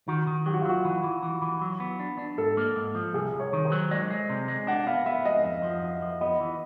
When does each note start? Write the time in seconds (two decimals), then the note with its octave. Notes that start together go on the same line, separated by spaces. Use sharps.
0.08 D#3 F#4
0.27 D#3
0.46 F#3 G4
0.54 F#4
0.61 F4
0.65 F#3 F#4
0.85 E3
1.04 E3
1.23 E3
1.42 E3
1.62 F#3
1.80 B3
2.00 D4
2.18 D4
2.38 G#2 A4
2.57 A#3
2.76 G#2
2.95 F3
3.14 C2 G#4
3.34 C2
3.40 C#5
3.53 D#3
3.65 C5
3.72 F#3
3.91 G#3 D5
4.10 G#3
4.30 C3
4.48 G#3
4.67 D4 F#5
4.87 B3 F5
5.06 B3 E5
5.25 G#3 D#5
5.44 F2
5.63 F3
5.83 F2
6.02 F3
6.21 B3 D#5
6.40 E3